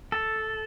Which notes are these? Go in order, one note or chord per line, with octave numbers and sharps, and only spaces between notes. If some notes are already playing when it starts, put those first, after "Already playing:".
A4